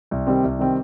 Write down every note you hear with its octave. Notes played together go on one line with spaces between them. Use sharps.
C2
C3 D#3 G3 C4
C2
C3 D#3 G3 C4